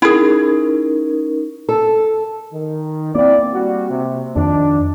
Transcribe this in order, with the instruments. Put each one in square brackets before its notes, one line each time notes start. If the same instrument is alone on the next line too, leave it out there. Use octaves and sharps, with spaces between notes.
[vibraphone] C#4 D#4 A#4 [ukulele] E4 G#4
[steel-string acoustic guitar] A4
[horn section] D#3
[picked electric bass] A#3 C4 [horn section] E4 D5
[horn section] G3 F#4
C3
[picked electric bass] F2 D#3 [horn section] D4